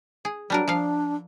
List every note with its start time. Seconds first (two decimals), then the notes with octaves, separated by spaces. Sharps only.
0.25 G#4
0.50 F#3 G3 D4 A#4
0.68 F3 D4 F5